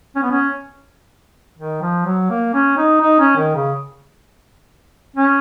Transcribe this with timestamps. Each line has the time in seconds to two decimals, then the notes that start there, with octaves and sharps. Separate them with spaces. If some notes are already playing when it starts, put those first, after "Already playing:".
0.16 C#4
0.23 B3
0.31 C#4
1.58 D#3
1.82 F3
2.06 F#3
2.30 A#3
2.54 C#4
2.78 D#4
3.02 D#4
3.20 C#4
3.37 D#3
3.55 C#3
5.16 C#4